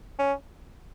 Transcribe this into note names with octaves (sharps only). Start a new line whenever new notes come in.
C#4